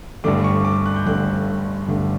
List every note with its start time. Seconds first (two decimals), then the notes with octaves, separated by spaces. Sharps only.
0.24 G1 G2 D3 A3 D6
0.44 C#6
0.65 D6
0.86 F#6
0.96 G6
1.06 G1 G2 D3 A3 F#6
1.88 G1 G2 D3 A3